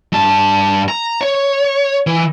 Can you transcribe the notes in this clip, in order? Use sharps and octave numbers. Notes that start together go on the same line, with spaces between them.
G2 A5
A#5
C#5
E3